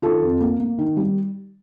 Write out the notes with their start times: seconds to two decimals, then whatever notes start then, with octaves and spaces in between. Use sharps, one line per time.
0.02 D#3 F4 A4
0.22 F2
0.41 A#3
0.60 A#3
0.78 D#3
0.97 G3